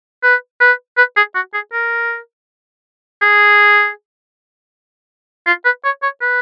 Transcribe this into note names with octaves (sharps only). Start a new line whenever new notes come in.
B4
B4
B4
G#4
F#4
G#4
A#4
G#4
F4
B4
C#5
C#5
B4